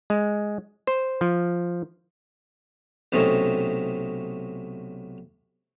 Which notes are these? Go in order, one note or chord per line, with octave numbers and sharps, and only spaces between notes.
G#3
C5
F3
B1 C3 A3 C4 C#4 D#5